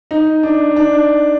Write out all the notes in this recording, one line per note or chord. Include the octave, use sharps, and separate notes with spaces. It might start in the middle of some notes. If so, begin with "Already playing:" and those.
D#4
D4
D#4
D4